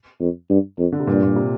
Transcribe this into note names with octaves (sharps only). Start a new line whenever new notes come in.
F2
G2
F2
D3
C3
G2 A#2
A#2
C3